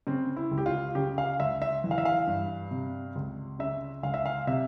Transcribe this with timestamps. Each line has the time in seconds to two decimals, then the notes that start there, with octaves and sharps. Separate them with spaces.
0.07 C#3 C4
0.37 E4
0.51 C#2
0.58 G4
0.66 F4
0.95 C#3 G4
1.18 F5
1.40 C#2 E5
1.62 E5
1.84 E3
1.91 F5
1.98 E5
2.05 F5
2.27 G2
2.71 C3
3.15 C#2
3.59 C#3 E5
4.03 C#2 F5
4.14 E5
4.26 F5
4.47 C3 E5